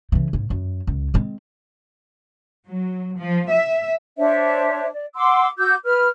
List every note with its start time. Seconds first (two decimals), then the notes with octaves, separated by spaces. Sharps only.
0.12 C#3 E3
0.33 G#2
0.50 F#2
0.87 C#2
1.14 G#3 C4
2.70 F#3
3.20 F3
3.51 E5
4.16 D4 C5 C#5 E5
4.93 D5
5.15 F#5 C6 D6 E6
5.58 F#4 D6 E6 G6
5.85 B4 F6